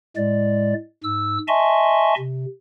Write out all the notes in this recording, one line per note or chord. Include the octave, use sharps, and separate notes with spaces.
A2 G#3 D5
G#2 E6
D#5 E5 G#5 A5 C6 C#6
C3